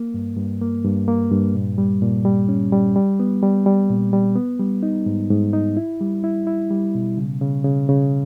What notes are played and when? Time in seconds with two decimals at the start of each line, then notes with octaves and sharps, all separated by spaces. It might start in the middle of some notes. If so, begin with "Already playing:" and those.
Already playing: A#3
0.14 G2
0.37 G2
0.61 A#3
0.85 G2
1.08 A#3
1.32 G2
1.55 A#2
1.78 G3
2.02 A#2
2.25 G3
2.49 C#4
2.72 G3
2.96 G3
3.20 B3
3.43 G3
3.66 G3
3.90 A#2
4.13 G3
4.36 B3
4.59 G3
4.83 D#4
5.06 G#2
5.30 G#2
5.53 D#4
5.77 E4
6.01 G3
6.24 E4
6.47 E4
6.71 G3
6.95 B2
7.17 C#3
7.41 C#3
7.65 C#3
7.89 C#3